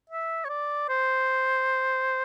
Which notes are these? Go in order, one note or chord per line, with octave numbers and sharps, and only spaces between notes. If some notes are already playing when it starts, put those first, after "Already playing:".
E5
C#5
D5
C5